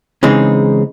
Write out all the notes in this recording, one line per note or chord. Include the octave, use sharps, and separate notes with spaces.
C#3 E3 G#3 C4 D#4